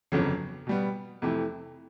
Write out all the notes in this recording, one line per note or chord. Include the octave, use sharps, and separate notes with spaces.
G1 F2 C#3 F#3
B2 G3 B3
F2 C3 E3 A3